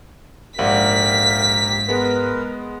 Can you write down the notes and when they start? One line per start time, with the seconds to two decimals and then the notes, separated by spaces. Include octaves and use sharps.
0.59 A#1 G#2 G4 A#4 D5 F5 F#5 B6
1.89 G#3 B3 A#4 B4